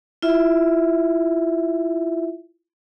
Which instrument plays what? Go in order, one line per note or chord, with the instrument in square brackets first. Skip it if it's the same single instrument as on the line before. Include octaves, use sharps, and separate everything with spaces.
[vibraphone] E4 F4 E5